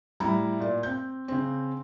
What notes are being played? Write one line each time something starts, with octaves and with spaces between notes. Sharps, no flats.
A2 G3 E4 A#5 B5
A#2 D5
C4 G6
C#3 C4